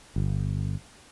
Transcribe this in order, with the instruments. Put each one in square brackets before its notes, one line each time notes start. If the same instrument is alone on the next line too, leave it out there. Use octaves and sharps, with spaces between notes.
[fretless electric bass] G1